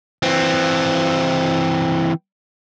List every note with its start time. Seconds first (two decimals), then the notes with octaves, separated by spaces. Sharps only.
0.23 E3 C4